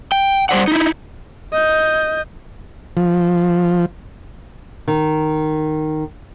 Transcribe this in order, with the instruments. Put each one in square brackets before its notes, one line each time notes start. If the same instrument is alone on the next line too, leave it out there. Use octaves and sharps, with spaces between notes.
[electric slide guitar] G5
G3 C5 D5 F#5
D#4 E4
[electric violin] D#5 G6
[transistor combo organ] F3
[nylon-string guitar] D#3